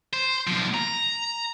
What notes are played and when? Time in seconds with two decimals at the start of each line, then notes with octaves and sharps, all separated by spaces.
0.13 C5
0.47 B1 F3
0.74 A#5